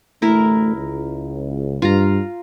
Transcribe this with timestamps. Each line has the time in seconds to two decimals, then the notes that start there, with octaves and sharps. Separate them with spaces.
0.22 A1 D2 A3 E4 A#4
0.76 C#2
1.82 G2 F4 A#5